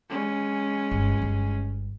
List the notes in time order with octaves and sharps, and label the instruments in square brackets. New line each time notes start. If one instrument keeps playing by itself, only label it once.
[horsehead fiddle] G#3 C#4
[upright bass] G1
G1